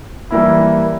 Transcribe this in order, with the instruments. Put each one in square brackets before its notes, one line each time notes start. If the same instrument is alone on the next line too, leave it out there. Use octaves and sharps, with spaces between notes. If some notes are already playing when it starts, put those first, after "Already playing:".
[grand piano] E3 G3 A#3 E4